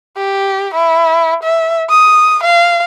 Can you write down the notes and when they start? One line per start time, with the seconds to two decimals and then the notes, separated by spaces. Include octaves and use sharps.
0.17 G4
0.74 E4
1.43 E5
1.90 D#6
2.43 F5